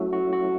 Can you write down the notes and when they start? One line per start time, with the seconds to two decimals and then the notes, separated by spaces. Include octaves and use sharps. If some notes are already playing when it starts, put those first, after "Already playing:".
Already playing: F#3 A3 C#4 E4 F#4
0.13 F#4
0.33 F#4